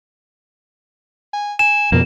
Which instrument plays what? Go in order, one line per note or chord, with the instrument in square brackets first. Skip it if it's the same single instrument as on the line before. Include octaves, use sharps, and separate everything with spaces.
[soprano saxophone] G#5
[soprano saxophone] G#5 [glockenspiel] E7
[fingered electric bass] F2 B2 [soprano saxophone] A#3